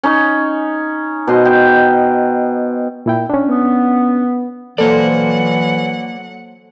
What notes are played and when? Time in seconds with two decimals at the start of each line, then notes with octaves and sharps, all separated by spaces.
0.03 C#4 D#4
1.27 B2 C5 D#5
1.45 G5
3.06 A#2 E4 G5
3.30 C#4 D4
3.47 B3
4.78 E3 F#3 A#3 A4 C5 D5 F#5